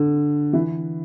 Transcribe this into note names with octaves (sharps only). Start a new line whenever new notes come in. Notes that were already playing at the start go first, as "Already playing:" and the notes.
Already playing: D3
E3